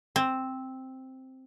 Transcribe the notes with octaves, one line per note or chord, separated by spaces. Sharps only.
C4